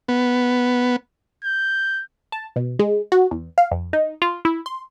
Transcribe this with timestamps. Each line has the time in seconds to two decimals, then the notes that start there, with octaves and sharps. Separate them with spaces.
0.08 B3
1.44 G6
2.32 A5
2.56 B2
2.79 G#3
3.12 F#4
3.31 E2
3.58 F5
3.71 F2
3.93 D#4
4.22 F4
4.45 E4
4.66 C6